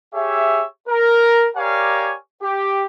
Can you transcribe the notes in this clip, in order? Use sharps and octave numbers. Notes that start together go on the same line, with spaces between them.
G4 G#4 C#5 E5
A#4
G4 A#4 C#5 D5 F5 G#5
G4